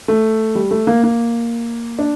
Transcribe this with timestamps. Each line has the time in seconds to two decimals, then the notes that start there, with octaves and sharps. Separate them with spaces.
0.08 A3
0.55 G3
0.71 A3
0.87 A#3
1.03 A#3
1.99 D4